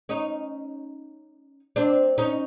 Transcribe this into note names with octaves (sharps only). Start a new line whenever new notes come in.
C#4 D#4
C4 D4
C#4 D#4